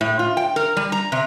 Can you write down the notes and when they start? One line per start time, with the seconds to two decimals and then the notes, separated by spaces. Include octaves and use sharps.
0.01 A2
0.19 F4
0.37 G5
0.56 A#4
0.77 G3
0.92 A#5
1.12 C3